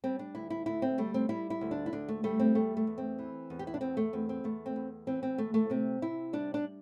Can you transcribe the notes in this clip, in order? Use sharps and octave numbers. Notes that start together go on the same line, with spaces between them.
G3 C4
D4
D2 E4
E4
D2 E4
C4
G3 A3
C4
G3 E4
E4
D2
D4
E4
D2 D4
A3
G3 A3
C4
E2 A3
A3
E2
C4
E3
E2
G4
E4
D4
E2 C4
A3
E2 C4
C4
E2 A3
C4
E2
E3 C4
C4
D2 A3
A3
C3 C4
C3 E4
G3 D4
D4